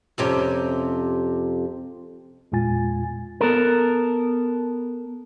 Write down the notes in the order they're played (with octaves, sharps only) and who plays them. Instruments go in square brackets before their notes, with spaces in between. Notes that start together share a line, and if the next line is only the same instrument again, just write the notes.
[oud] F2 C3 C#4
[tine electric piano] E2 A#2 G#3 F4 G#5 A6
[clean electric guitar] B3 A4 A#4